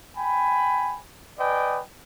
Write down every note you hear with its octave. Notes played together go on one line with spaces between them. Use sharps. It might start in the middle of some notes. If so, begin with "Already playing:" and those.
G5 G#5 B5
B4 D5 D#5 G5 G#5